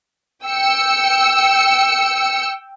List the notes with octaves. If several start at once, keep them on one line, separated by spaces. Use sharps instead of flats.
G5 E6 C#7